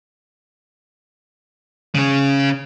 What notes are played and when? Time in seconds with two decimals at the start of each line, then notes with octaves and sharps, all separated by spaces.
1.95 C#3 C#4